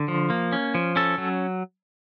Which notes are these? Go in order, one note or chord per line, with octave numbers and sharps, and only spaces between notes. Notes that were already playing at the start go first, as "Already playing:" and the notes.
Already playing: D3
F3
A#3
C#4
F3
C#4 A4
F#3